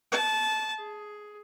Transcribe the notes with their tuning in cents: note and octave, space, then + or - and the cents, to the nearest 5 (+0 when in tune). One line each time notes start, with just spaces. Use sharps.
A5 -20
G#4 +10